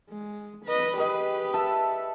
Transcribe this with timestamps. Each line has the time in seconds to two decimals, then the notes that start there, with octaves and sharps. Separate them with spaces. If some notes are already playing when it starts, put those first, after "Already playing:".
0.10 G#3
0.65 B4 D#5
0.97 G4 G#4 B4 D#5
1.54 A4 E5 A5